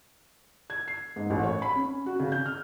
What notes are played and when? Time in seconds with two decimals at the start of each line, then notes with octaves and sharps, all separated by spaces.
0.70 G#6
0.88 C7
1.16 G#2
1.30 A1
1.43 C#5
1.62 B5
1.76 C#4
2.06 F#4
2.20 C#3
2.32 G6
2.46 F6